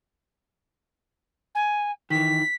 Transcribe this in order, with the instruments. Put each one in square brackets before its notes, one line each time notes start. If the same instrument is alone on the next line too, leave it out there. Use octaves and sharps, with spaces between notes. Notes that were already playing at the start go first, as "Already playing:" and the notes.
[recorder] G#5
[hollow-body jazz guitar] D#3 E3 [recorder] B6